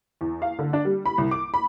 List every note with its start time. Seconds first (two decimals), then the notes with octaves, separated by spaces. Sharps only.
0.21 E2
0.42 F5
0.59 D3
0.73 D4
0.85 G3
1.06 B5
1.18 C2
1.31 D6
1.54 B5